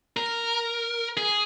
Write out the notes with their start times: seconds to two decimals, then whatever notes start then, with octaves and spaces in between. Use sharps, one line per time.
0.17 A#4
1.17 G#4